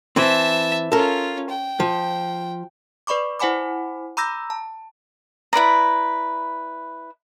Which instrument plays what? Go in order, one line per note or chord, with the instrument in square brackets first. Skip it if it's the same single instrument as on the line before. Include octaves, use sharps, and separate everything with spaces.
[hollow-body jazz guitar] E3 C4 [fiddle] E5 A5
[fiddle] C#4 F4 [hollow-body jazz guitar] A4 A#4
[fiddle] G5
[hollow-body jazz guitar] F3
[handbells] B4 D5 B5 C#6 D6
E4 C5 F#5 G#5 B5 D6
A#5 B5 D6 E6 G6 A#6
A5
[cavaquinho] E4 B4 D5 A#5